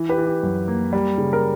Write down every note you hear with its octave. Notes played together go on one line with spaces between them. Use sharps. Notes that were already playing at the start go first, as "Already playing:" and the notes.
Already playing: E3
G4 B4
E3
G4
F#2
A#3
G3
C#3
A#4